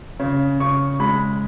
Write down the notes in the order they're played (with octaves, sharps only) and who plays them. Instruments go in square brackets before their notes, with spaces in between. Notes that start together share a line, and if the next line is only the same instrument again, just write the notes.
[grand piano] C#3
C#3 C#6
G#3 B5